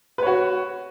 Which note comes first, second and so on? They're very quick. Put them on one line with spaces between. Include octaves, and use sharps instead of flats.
B4 C#5 F#4